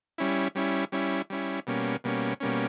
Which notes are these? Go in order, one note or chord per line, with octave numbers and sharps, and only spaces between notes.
G3 C#4 E4
G3 C#4 E4
G3 C#4 E4
G3 C#4 E4
B2 G3 A#3 C#4
B2 G3 A#3 C#4
B2 G3 A#3 C#4